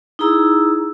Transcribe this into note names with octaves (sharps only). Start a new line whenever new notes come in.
D#4 E4 G#4 A#5 E6